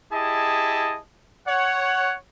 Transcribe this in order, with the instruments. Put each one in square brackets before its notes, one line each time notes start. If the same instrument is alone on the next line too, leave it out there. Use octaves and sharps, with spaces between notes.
[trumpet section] E4 G4 G#4 D#5 A5
C#5 F#5